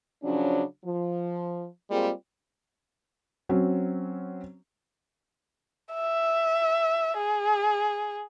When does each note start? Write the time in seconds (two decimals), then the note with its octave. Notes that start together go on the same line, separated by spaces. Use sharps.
0.23 C#3 F3 F#3 C#4 D4
0.85 F3
1.91 G3 G#3 A#3 C4 F4 G#4
3.49 F#3 C4 C#4
5.94 E5
7.17 G#4